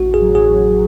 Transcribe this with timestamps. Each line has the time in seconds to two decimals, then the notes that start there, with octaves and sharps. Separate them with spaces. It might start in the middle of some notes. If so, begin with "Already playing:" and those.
Already playing: A1 F#4
0.14 G#4
0.22 F#3
0.35 G#4